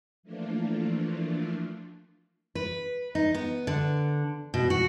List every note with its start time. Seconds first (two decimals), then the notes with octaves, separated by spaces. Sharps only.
0.23 E3 F3 A3 A#3 D4 F4
2.55 B4
3.15 D#4
3.34 B3
3.67 D3
4.54 B2
4.70 F#4